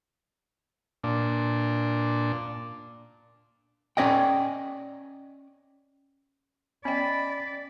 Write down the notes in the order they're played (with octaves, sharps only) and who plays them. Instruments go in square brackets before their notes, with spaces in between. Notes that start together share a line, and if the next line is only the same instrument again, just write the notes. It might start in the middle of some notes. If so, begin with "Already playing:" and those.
[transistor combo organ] A#2 D4
[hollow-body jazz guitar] C#4 D5 D#5 G5
[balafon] B3 D#5 G5 [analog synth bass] C#4 [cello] D5 [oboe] B5